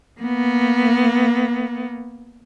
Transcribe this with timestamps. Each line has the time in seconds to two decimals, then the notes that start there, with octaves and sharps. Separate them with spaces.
0.20 A#3 B3